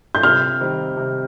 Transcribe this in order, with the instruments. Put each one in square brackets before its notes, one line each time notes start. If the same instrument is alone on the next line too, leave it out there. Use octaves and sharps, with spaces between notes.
[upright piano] G6
[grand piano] C3 [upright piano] F6
[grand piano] D#3 G3 C4
C3